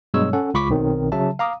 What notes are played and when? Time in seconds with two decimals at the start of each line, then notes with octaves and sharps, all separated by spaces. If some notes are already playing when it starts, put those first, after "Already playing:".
0.14 G2 B2 F#3 G#3 C#5 E6
0.33 C#4 A4 F#5
0.54 C#2 F4 B5 C#6 D6 B6
0.70 B1 D#3 F#3 C4
1.12 C#3 F#3 E5 A5
1.39 F5 A#5 D6 D#6